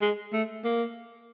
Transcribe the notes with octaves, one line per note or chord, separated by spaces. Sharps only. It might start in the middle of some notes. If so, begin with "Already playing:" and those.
G#3
A3
A#3